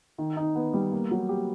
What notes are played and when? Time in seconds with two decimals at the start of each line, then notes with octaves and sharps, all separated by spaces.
0.18 D#3
0.37 D#4
0.55 B3
0.74 G3
0.92 A#3
1.11 F#3
1.29 G4